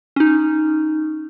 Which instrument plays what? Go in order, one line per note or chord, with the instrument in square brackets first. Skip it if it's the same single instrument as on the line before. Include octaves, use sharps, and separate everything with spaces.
[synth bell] C#4 D#4